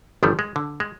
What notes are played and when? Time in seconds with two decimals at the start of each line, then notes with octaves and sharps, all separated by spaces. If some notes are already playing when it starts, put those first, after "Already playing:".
0.23 G1 D#3 F3 G3 A3
0.39 G#3
0.56 D3
0.80 G#3